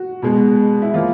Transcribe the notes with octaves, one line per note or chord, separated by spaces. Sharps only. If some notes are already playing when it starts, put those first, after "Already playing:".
Already playing: F#4
B2 G#3
E4
F3 A#3 F4